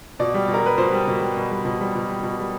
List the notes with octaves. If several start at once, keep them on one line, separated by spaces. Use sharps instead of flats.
B2 D5
G3
B2
A#4
G3 B4
B2 C5
G3
B2
G3
B2
G3
B2
G3
B2
G3
B2
G3